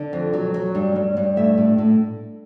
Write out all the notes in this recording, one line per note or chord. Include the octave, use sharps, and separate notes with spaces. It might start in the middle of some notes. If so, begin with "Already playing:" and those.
Already playing: D3
F2
F#3
F#3
G2
G2
G2
A2 E5
A2
A2